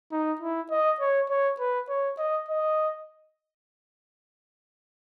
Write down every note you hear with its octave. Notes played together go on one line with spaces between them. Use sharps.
D#4
E4
D#5
C#5
C#5
B4
C#5
D#5
D#5